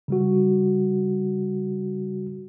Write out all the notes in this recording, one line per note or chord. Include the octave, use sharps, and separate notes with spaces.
C#3 G3 F#4